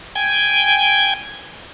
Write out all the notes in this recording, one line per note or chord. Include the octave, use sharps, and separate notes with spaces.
G5 G#5 G#6